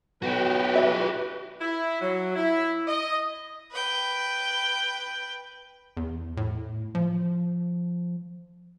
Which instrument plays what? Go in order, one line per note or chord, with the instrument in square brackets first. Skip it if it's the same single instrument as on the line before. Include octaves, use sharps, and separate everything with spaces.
[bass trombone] B1 [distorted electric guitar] F#4 G4 [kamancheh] B4
[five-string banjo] E5
[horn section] E4
F#3
E4
D#5
[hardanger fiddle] B4 G5
[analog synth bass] E2
A2
F3